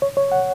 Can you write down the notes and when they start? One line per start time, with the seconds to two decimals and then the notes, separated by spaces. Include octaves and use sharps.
0.02 C#5
0.17 C#5
0.32 F#5